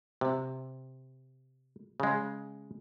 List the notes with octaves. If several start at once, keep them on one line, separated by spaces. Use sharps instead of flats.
C3
C#3 G#3